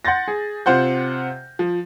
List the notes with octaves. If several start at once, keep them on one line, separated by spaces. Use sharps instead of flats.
F#5 C6 G6 A6 A#6
G#4
C3 F4 C5 F#5 G6
F3